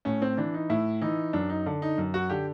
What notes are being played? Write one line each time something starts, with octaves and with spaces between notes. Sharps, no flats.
A2 C#4
C4
E3 D4
D#4
A2 E4
E3 D#4
F#2 D4
D#4
D3
D#4
F#2
F#4
D3 G4